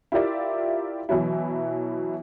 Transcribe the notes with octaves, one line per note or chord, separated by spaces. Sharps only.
E4 F4 G4 A#4 D5 E5
B2 E3 F#3 E4